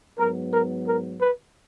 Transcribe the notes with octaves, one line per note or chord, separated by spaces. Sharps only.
G#2 F#3 B3 A#4
A#4
A#4
B4